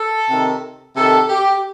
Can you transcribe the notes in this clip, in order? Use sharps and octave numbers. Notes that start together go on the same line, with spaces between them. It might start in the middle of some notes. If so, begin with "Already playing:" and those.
Already playing: A4
C3 D#3
C3 D#3 A4
G4